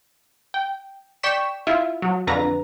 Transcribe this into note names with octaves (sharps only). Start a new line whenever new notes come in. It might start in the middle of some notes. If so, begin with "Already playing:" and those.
G5
D5 G5 C#6 B6 E7
E4 F4 E5
F#3
F2 D3 B4 A#5 A#6